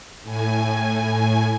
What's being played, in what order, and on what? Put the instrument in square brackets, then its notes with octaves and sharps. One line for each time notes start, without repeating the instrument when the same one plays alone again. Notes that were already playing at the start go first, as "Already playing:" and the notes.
[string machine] A2 G#5